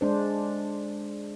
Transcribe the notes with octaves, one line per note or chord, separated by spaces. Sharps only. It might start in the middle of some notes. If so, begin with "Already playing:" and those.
G#3 D4 C5